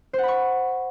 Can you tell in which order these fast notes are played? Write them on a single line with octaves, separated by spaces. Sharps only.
C5 F#5 B5 C#6